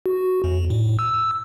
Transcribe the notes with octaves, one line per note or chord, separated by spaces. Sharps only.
F#4
F2
A2
E6